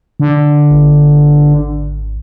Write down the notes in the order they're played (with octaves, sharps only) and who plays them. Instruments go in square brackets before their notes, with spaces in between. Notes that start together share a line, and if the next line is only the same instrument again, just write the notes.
[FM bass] D3
[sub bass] G#1